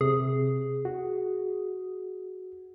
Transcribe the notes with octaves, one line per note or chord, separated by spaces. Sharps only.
C3 G#4
F#4